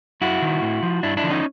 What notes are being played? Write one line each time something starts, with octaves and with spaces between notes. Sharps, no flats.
F#2 E4 F#4
D#3
A2
F3
G2 D4 E4
D4 E4
D3 F3
C#4 D#4